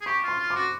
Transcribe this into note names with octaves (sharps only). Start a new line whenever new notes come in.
G#4
G4 C#6
F4 C6
F4
D6
F#4